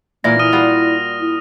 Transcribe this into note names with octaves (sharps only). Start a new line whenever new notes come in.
A#2 E3 A#3 A#4 A#6
E4 D#6 F6 D#7
G3 F4 F#4
E4